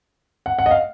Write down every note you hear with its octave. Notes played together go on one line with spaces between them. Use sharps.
F#5
F#5
D#5
F5